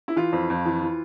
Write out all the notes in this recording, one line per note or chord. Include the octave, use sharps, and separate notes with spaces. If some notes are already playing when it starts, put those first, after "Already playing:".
E4
E3 F4
F2
F2
E3
E3